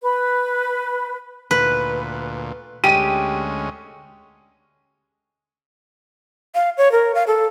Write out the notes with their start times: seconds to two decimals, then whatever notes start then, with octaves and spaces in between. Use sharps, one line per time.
0.02 B4
1.51 D2 A#2 B4
2.84 D2 G#3 C#4 G4 D#7
6.55 F5
6.78 C#5
6.92 A#4
7.15 F5
7.27 A4